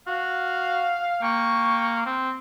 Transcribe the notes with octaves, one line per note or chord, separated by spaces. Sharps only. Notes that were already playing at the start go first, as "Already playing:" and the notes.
F#4 F5
A#3 G5 C#6
C4